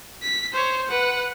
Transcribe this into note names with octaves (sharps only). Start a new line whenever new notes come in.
B6
C5 C#5
B4 F#5